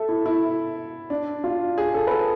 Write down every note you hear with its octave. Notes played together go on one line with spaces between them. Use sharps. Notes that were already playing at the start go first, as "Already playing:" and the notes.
Already playing: A4 E5
E4
E4
D4
F4
G#4
A4
B4
A4